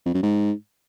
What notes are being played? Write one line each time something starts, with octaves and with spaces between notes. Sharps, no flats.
F2
F#2
G#2